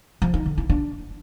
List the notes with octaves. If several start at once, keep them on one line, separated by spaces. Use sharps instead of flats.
F3
D#4
D3
E4
D4